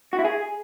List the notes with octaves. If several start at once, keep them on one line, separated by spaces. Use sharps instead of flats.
F#4
E4
G#4